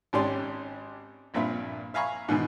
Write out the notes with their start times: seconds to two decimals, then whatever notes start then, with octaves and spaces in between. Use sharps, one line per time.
0.13 G#1 G#2 C#4 G4 D5 C6
1.34 A#1 G2 A#2 C4 E5 B5
1.94 E5 F5 G#5 A#5 B5 C#6
2.28 G#2 B2 D#3 E3